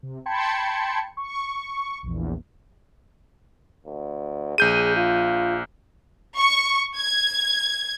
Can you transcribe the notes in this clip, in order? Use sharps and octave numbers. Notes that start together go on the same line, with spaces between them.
C3
G5 A5 B5 C6 G#6 C#7
C#6
A#1 E2
D2
A#1 G#4 G6 D#7
F4
C#6
G#6